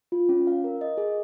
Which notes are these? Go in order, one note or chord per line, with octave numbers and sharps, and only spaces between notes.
F4
C#4
F5
A#4
D#5
G#4